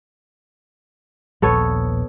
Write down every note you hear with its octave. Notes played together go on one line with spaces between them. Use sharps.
D#1 A#1 B3 A4 C#5